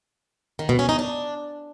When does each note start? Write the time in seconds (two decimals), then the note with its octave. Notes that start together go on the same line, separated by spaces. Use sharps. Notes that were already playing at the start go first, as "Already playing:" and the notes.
0.59 D#3
0.69 B2
0.79 C#4
0.89 D#4
0.99 D4